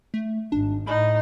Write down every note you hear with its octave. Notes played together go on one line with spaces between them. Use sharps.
A3
G#1 D4
A2 D#4 B5